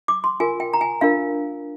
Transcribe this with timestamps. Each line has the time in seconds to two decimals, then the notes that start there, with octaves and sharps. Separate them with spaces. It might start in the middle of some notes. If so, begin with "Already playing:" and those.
0.08 D6
0.24 C6
0.40 F4 A#4 G#5
0.60 G5
0.73 A#5
0.81 G#5
1.01 D4 F4 A#4 F5